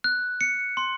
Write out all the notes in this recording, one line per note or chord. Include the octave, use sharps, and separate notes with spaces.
F#6
C#7
C6